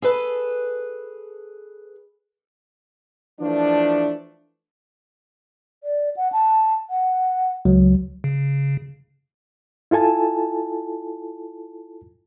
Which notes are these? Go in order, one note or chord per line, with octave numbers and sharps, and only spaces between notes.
G#4 A4 B4
E3 F3 A3 D4
D5
F#5
A5
F#5
C#2 F#3
C#3
E4 F4 A4 G#5 A5